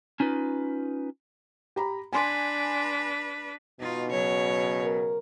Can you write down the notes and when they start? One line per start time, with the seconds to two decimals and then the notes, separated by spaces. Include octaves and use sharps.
0.20 C#4 D#4 F4 B4
1.76 G4 A#5 B5
2.13 D4 B4 G#5 C6
3.80 B2 D#4 F4
4.10 C#3 F#3 C#5
4.83 A#4